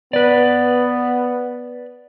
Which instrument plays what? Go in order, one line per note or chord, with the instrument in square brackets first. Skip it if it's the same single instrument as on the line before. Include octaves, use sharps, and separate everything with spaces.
[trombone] B3 [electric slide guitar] B4 D5